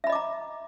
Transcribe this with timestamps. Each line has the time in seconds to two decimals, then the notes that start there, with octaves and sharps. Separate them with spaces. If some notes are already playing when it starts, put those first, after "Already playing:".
0.04 E5
0.07 B5
0.10 D#5
0.12 D6
0.15 A#5